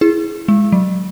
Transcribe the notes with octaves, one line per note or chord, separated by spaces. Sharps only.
E4 G#4
G#3
F#3